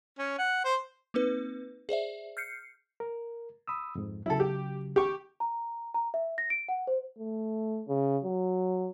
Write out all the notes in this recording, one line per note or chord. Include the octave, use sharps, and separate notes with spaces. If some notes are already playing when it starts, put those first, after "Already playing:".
C#4
F#5
C5
A#3 C4 D#4 B4
G#4 C5 D5 E5
F6 G6 C7 C#7
A#4
B5 D#6 E6
F2 G#2
C#3 F#3 E4 A4
G4
G4 C#6
A#5
A#5
E5
A#6
D7
F#5
C5
A3
C#3
F#3